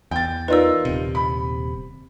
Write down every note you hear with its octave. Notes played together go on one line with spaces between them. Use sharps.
E2 G5 A6
D#4 F4 A#4 B4 D5 E6
D#1 C3
B5